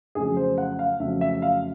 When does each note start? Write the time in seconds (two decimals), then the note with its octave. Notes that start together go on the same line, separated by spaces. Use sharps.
0.15 F2 C#3 F#3 A3 G#4
0.37 C5
0.58 F#5
0.79 F5
1.00 F2 C#3 F#3 A3 E5
1.21 E5
1.42 F5